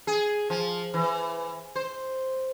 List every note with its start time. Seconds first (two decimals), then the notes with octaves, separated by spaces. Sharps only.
0.07 G#4
0.50 F3
0.94 E3
1.76 C5